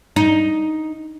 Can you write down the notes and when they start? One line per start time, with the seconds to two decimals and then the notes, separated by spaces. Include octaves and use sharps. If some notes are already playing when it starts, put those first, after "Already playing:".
0.16 D#4